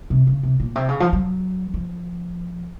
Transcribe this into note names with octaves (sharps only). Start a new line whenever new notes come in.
C3
C#3
C3
A#2
C3
C#3
F3
F#3
F3